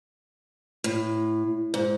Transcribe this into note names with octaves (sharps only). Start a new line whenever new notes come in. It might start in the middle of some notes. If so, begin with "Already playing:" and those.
A2
G#2